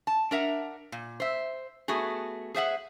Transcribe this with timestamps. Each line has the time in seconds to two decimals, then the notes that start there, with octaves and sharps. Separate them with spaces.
0.07 A5
0.31 D4 A#4 E5 F#5
0.92 A#2
1.20 C5 E5
1.88 A3 B3 F#4 G#4
2.54 G#4 C5 E5 F#5